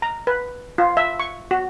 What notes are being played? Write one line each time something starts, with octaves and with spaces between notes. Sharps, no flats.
A#5
B4
F4
E5
C#6
F#4